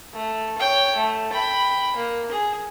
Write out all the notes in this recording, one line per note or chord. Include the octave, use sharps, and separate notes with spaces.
A3
C#5 G5
A3
G5 B5
A#3
G#4